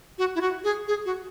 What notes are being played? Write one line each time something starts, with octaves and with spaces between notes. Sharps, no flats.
F#4
E4
F#4
G#4
G#4
F#4